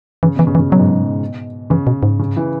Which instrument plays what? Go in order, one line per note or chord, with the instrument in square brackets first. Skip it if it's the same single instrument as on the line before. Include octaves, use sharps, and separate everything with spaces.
[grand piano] C#3 [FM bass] E3
[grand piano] B2
[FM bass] E3
[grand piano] C#3
[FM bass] E3
[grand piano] C#3
[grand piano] B2 [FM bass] F#3
[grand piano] G#2
B2
[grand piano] C#3 [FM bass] E3
[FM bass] B2
G#2
[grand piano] C#3
E3